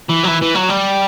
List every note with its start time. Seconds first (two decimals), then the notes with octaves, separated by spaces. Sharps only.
0.10 E3
0.24 F#3
0.28 E3
0.42 E3
0.55 F#3
0.70 G3